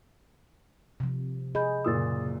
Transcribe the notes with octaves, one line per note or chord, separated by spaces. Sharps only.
C3 F3
G#4 D#5 B5 G6
F#1 A#2 D#6 E6 A6